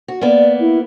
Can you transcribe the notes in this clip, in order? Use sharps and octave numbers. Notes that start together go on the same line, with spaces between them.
F#4
A#3 B3 D5
E4